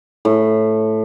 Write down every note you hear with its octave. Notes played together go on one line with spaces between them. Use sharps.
A2